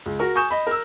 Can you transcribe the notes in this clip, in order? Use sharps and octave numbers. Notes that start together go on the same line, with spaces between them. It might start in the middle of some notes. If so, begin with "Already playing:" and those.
C#2
F#4 A#4
G#5 C#6 D#6 G6 E7
D#5 B5
A#4 E6